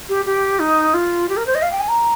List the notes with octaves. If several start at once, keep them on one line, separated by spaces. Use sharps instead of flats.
G4
G4
D#4
F4
G4
A#4
C5
D#5
F5
G5
G#5
A#5